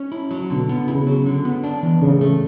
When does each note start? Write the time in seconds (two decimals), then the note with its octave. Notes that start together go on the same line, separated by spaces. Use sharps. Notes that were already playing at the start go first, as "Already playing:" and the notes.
Already playing: C#4
0.12 E4
0.31 F#3
0.50 B2 D3
0.69 B3
0.88 C#3 E4
1.07 F#3
1.26 D3
1.45 B3
1.64 D4
1.83 E3
2.01 A2 C#3
2.21 A3